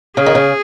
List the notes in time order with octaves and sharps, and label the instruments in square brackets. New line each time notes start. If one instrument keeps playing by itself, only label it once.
[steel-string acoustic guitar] C#3 [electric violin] G#4
[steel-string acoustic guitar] D#3
C#3